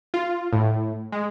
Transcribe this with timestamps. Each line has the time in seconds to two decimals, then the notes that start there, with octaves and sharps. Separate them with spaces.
0.14 F4
0.53 A2
1.12 G#3